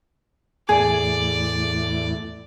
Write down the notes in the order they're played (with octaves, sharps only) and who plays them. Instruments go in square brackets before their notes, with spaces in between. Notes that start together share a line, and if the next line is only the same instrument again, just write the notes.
[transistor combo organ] E2 A2 [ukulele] G#4 [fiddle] D5